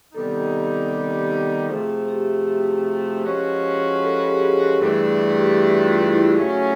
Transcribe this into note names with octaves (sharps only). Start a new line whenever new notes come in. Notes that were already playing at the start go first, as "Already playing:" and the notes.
C3 D#3 G3 B3 D#4 A4
C3 F3 A3 G#4
G4
G4
F#4
G4
F3 G#3 C#4 F#4 B4
A4
G#4
G4
G#4
G2 E3 A3 D4 G#4
G#4
G4
F#4
F4
E4
C#3 F#3 A3 C#4 F#4